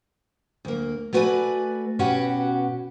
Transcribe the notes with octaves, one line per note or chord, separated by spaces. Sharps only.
D2 A#3
A3 B3 F#4 B4 D5 G#5
B2 C#4 F#4 G4 B4 F#5